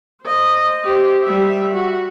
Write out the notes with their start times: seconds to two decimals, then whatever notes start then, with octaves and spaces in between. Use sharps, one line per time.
0.22 C5 D#5
0.85 G4 C5
1.24 G3 E5
1.73 F#4